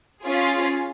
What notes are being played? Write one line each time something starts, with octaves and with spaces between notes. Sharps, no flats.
C#4 F4 G#4